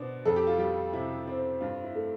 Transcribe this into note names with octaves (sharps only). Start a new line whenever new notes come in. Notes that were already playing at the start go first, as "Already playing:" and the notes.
Already playing: B2 D4 C5
F2 A4
G4
F4
G3 G4
C3 E4
C4
G2 F4
E4
A3